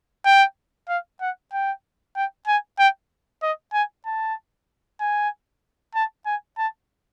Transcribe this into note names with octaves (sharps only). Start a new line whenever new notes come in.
G5
F5
F#5
G5
G5
G#5
G5
D#5
G#5
A5
G#5
A5
G#5
A5